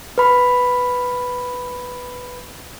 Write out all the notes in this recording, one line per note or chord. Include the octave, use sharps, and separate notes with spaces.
B4 B5